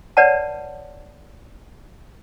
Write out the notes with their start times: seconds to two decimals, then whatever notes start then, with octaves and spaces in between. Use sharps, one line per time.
0.17 B4 C#5 D5 F#5 A5